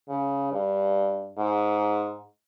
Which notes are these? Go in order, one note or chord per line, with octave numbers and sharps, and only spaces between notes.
C#3
G2
G#2